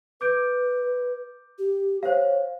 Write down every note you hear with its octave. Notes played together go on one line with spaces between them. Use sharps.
B4 D6 G6 D7
G4
C5 C#5 F5